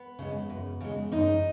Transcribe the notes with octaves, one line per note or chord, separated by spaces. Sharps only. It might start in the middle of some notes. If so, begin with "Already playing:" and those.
Already playing: B3
C#3 G#3
F#2
C#3 G#3
F#2 D#4